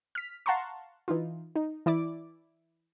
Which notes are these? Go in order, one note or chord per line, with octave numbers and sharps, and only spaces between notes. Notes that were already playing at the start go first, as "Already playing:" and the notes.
F6 B6
F5 F#5 A5 A#5 C6 C#6
E3 D#4 F4
D#4
E3 E4 D5 D6